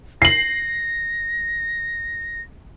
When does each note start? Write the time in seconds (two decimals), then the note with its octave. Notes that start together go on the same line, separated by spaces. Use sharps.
0.22 A#6 C7 F#7